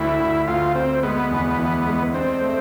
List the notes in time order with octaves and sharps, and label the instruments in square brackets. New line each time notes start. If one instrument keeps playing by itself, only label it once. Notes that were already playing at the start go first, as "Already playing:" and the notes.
Already playing: [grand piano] D2 [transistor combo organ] E4
[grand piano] D2
[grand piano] D2 [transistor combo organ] F4
[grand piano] D2 [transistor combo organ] C4
[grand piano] G#3 [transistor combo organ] B3
[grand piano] E2
E3
G#3
[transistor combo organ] C4 [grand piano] D4
[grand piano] A3